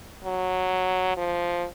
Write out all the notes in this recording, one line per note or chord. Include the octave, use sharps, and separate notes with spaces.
F#3
F3